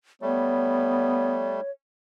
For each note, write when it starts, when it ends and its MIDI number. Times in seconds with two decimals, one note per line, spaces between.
0.22 1.61 55
0.22 1.61 57
0.22 1.57 59
0.22 1.71 73